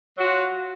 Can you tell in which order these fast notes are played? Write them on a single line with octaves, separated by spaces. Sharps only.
F#3 F#4 F4